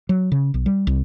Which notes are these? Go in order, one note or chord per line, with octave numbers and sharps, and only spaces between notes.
F#3
C#3
B1
G3
C2